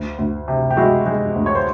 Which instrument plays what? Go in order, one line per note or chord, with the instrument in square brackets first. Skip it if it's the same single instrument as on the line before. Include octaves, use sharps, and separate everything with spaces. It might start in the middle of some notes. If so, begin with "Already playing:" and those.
Already playing: [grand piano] D2
D2
C3
G4
G#3 E4 F#4
G#3
D2
C#5
C5